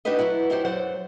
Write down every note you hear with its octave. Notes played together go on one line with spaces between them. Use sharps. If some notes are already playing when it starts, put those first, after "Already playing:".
D4 D#4 F#4 G4 B4 D#5
F#3 B3 E4 F#4
B3 C#4 D#4 E4 G4 C5
F#2 F#3 C5 D5 F#5